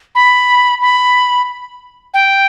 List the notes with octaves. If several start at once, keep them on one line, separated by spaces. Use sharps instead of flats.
B5
B5
G5